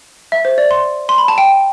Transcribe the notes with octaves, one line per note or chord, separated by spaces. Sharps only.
E5
C5
D5
C6
C6
B5
A5
G5